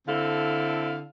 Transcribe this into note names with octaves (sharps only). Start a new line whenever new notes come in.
D3 C4 E4 A4 F5